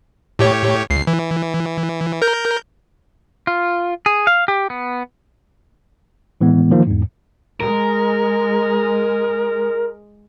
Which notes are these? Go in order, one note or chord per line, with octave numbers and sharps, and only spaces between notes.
A2 G4 C#5
C#2 C7
E3
A#4 G6
F4
G#4
F5
G4
B3
A2 E3 G#3 B3
D#3 F3 A#3
E2 G#2
G#3 A#4